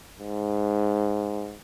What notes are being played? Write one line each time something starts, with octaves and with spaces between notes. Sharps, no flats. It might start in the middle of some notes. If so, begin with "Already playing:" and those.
G#2